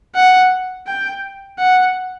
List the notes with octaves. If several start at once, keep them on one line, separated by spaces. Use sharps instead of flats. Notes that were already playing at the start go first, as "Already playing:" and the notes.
F#5
G5
F#5